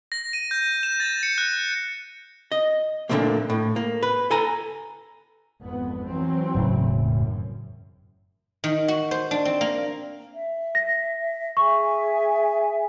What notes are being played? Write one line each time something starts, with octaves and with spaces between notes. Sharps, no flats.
A#6
D#7
G6
E7
A6
C#7
F#6
D#5
A#2 D3 F3 F#3 A3 A#3
A2
A#3
B4
A4 G#5 A#5
G#1 F2 B3
E3 F#3 C4
E1 A2 C#3
F#2
D#3
F#4
C5
D4
C4
A#3
E5
A#6
G#4 E5 G#5 C#6